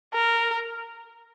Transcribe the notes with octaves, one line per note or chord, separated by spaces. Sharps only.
A#4